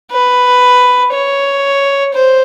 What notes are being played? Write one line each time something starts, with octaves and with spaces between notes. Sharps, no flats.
B4
C#5
C5